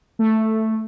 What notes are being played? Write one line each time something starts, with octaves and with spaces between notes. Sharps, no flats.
A3